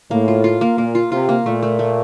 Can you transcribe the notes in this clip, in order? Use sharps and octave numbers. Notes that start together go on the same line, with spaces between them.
A2 A#3
F4
F4
A#3
A#2 A#3
F4
C3 F4
A#3
A#2 A3
A3
A3